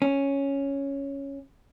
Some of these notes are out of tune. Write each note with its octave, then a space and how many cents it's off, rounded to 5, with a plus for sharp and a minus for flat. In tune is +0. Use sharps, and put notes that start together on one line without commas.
C#4 +0